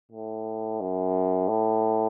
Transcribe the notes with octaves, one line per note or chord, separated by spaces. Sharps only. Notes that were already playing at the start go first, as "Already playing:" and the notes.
A2
F#2
A2